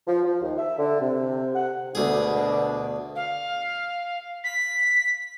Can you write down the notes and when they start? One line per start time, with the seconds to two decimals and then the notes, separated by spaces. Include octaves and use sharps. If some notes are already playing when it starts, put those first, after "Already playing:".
0.08 F3
0.23 F3
0.42 D#2
0.58 E5
0.78 D3
1.00 C3
1.56 F#5
1.95 D2 B2 D4 G#4
3.16 F5
4.44 B6